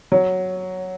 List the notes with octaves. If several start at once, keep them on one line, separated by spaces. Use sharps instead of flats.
F#3